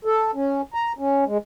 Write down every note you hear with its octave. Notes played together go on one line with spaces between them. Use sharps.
A4
C#4
A#5
C#4
G#3